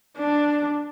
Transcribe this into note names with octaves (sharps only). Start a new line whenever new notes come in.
D4